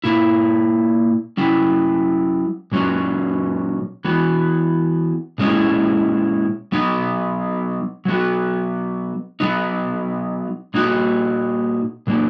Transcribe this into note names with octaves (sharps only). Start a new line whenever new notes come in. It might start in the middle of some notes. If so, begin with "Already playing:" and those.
A#2 A#3 E4
F#3 C#4 E4
A#2 F#3 C#4
E3 B3 F#4
A#2 G#3 C#4 E4
F#3 B3 D#4
F#3 B3 F#4
F#3 B3 D#4
A#2 A#3 D#4 F#4
A#2 F#3 A#3